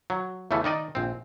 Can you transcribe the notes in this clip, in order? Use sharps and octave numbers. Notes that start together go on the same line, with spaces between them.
F#3
E2 C#3 E3 A3
D#3 D#4 D5 D#5
A#1 C4